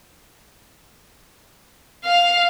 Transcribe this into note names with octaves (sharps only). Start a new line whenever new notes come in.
F5